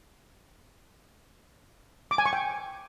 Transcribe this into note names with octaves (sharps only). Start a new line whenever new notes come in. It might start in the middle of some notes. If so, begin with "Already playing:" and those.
D6
G#5
C#6
G5